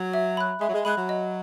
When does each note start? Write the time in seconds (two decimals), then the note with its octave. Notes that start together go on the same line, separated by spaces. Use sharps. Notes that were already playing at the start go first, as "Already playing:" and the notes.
Already playing: F#3
0.14 E5
0.37 B5 F#6
0.61 G#3 E5
0.69 F#3
0.74 G#3
0.85 G#3 B5 F#6
0.97 F#3
1.09 D#5